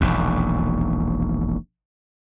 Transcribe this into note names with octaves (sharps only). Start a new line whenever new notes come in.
E1 A#1 D#2